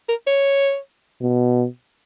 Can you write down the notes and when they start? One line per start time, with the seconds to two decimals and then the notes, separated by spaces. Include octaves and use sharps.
0.09 A#4
0.27 C#5
1.21 B2